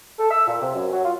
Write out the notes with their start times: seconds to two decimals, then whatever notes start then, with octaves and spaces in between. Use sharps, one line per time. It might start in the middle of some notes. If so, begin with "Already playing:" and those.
0.19 A4
0.31 E6
0.47 A#2
0.61 C3
0.75 F#2
0.92 F#3
1.05 F4